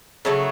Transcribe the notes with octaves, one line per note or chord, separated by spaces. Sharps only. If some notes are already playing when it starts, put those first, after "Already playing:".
C#3 F#3 A3 A4